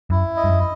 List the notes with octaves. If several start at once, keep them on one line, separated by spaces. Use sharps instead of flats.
F#2 E4
D#5
G2
F#2